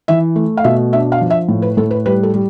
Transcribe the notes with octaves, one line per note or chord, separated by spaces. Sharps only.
E3 E5
A3
F5
B2 E5
D4 E5
F5
F3
E5
A2
B4
A2 A4
B4
G3 B4
A4
G3